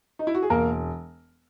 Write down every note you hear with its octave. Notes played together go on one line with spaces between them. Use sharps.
D#4
E4
F#4
G#4
E1 A#3 A#4